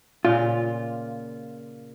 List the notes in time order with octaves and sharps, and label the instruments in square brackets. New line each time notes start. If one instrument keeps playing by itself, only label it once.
[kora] A#2 C#3 [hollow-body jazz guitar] F4